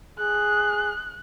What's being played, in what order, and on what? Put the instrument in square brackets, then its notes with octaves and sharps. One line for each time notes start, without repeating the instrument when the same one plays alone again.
[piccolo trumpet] G#4 [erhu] F#6